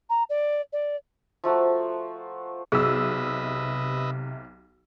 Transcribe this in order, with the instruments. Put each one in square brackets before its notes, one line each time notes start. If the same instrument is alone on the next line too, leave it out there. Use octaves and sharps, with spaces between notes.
[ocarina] A#5
D5
D5
[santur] F3 A3 F#4 A#5
[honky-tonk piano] B1 E6 [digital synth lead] C3 [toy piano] G#4 [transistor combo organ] B4 D#5 E5